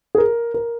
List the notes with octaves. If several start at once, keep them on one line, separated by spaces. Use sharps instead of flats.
G#4
A#4
A#4